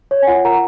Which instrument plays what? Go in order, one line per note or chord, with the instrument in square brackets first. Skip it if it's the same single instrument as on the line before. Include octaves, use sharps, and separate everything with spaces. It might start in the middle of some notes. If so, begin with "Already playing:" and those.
[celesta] C#5
G#5
F4 F#5
A#4 F#5 A#5